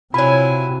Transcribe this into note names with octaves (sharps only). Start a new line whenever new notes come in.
C3 F#3 E4 F4 G#5 B5